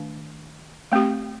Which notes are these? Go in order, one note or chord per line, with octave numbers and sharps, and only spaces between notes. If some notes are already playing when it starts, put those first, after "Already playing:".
Already playing: D#3 A3 D4
A3 C4 G4